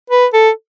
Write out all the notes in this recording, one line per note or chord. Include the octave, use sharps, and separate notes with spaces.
B4
A4